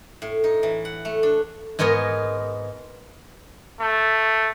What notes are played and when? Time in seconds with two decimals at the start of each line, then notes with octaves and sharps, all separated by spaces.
0.22 A2
0.44 D#4
0.63 E3
0.85 F#5
1.05 A3
1.23 D4
1.79 G#2 G#3 B3 A#4 C#5
3.81 A3